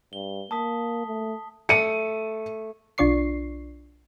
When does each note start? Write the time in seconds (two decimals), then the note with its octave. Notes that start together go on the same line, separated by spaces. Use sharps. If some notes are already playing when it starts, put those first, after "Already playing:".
0.13 G2 G7
0.51 A#3 A5 D#6 B6
1.06 A3
1.69 A3 C#7 D#7
2.98 B1 D4 F4 D5 C#6 C7